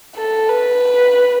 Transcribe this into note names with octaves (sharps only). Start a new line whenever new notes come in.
A4
B4